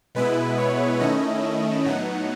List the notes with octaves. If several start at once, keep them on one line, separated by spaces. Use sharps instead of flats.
B2 G#3 B3 E4 B4
C#5
D#3 A3 C#4 E4 D#5
A2 F#3 B3 D#4 F#5